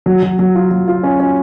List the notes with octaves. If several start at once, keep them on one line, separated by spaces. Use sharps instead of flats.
F#3
F#3
F#3
F4
F#3
F4
C#4
C#4